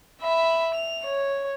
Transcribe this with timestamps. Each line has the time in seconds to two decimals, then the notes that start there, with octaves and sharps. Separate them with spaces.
0.22 E5 B5
0.74 F7
1.05 C#5